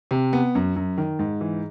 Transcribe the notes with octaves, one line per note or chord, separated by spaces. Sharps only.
C3
B3
F#2
F#2
D#3
G#2
E3